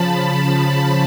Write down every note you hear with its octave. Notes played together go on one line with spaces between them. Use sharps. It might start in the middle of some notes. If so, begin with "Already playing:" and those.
Already playing: C#3 F3 A5 B5
A5